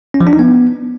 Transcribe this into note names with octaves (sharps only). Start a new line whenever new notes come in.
C#4
F3
D4
D#4
B3